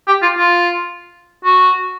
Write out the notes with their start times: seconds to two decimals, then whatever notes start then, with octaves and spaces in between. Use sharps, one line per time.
0.07 G4
0.22 F4
0.38 F4
1.44 F#4